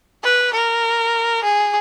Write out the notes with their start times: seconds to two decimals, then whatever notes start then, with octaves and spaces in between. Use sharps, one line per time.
0.23 B4
0.54 A#4
1.44 G#4